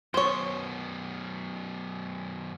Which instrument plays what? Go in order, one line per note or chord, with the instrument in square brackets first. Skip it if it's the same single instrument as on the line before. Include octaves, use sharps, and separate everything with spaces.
[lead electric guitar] F#2 B2 [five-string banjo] C5 C#5